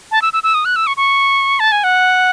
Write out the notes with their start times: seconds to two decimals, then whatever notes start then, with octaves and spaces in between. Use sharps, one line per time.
0.11 A5
0.22 E6
0.33 E6
0.43 E6
0.54 D#6
0.65 F#6
0.76 E6
0.87 C#6
0.97 C#6
1.60 A5
1.72 G#5
1.84 F#5